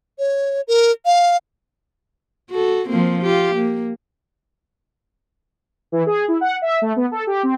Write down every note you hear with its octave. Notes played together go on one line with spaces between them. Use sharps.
C#5
A#4
F5
F#4 A4
F3 A#3 C4
F4 G4
A#3
E3
G#4
E4
F#5
E5
A3
B3
A4
G4
C4